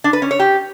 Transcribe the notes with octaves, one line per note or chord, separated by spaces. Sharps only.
D4
B4
C#4
C#5
G4